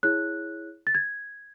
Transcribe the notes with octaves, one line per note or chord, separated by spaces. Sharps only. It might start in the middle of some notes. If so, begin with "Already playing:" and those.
E4 G#4 C#5 F#6
A6
G#6